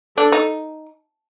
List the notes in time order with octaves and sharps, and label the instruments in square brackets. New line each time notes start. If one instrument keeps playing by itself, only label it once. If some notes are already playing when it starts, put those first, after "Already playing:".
[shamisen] D4 [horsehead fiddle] A4
[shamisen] D#4